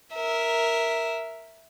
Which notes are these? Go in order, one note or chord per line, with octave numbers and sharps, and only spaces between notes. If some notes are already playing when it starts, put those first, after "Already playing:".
A#4 E5